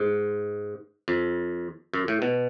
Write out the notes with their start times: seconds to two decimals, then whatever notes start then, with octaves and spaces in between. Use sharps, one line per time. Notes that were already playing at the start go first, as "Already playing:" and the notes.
Already playing: G#2
1.08 F2
1.94 F#2
2.08 A2
2.22 B2